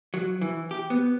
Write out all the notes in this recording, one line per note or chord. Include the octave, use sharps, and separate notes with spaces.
F#3
E3
G4
B3